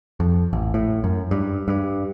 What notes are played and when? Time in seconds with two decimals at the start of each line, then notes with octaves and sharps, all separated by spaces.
0.20 F2
0.53 A1
0.74 A2
1.04 F#2
1.31 G2
1.68 G2